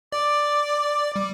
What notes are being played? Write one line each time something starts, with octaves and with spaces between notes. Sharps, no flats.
D5 D6
G3